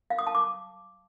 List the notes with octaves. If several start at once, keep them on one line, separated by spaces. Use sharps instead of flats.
F5
D#6
A5
D6